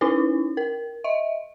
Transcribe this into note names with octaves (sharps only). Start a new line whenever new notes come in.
C#4 D#4 E4 B4
A#4
D#5 E5